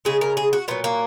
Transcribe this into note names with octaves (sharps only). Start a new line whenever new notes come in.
C#3 G#3 G#4
A#4
G#4
F#4
A#2 F#3 B3
A#3